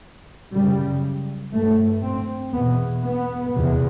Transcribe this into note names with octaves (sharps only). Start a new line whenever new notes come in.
F#2 C#3 G3
G2 A3
C4
E2 B2 B3
B3
E2 C3